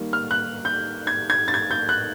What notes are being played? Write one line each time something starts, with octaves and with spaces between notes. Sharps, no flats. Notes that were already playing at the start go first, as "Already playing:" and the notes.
Already playing: D#3 G3 A#3
F6
F#6
G6
G#6
G#6
A6
G#6
G6
F#6